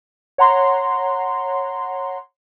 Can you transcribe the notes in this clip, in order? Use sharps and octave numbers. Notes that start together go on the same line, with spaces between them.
C#5 F#5 A#5 C6